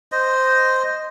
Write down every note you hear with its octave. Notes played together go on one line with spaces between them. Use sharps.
C5 D#5